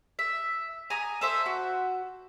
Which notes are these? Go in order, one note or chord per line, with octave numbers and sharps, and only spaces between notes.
E5
G#5 A#5 D#6
A4 C5 E5
F#4